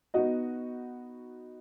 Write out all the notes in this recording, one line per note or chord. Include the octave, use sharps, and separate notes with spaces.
B3 D#4 F#4 D#5